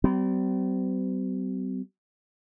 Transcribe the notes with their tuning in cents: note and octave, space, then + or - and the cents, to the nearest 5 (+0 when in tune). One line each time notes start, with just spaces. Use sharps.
G3 -40 C4 -40